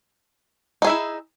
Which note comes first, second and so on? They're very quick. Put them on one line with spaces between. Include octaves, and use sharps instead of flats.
D#4 G#4 E5 E4